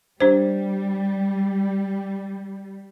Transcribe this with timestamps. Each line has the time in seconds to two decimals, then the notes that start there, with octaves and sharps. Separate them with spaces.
0.20 G3 D4 G4 C5